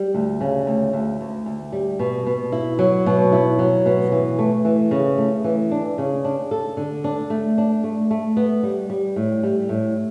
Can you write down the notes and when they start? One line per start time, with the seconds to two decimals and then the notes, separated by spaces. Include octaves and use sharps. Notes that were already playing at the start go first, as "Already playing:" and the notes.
Already playing: G3
0.14 D2
0.41 C#3
0.67 D2
0.93 D2
1.21 D2
1.46 D2
1.72 G3
1.99 B2
2.26 B2
2.52 E4
2.79 F#3
3.06 B2
3.32 E4
3.59 F#3
3.86 B2
4.12 E3
4.39 A3
4.65 E3
4.91 C#3
5.18 A3
5.44 E3
5.71 D4
5.98 C#3
6.25 D4
6.51 A4
6.77 D3
7.04 D4
7.30 A3
7.58 D4
7.84 A3
8.11 A3
8.37 B3
8.63 G3
8.90 G3
9.16 A2
9.43 G3
9.69 A2